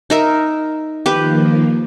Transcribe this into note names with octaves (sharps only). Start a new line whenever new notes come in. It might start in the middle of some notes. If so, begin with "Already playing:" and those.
D#4 A#4 E5
D#3 F3 A#3 G4 B4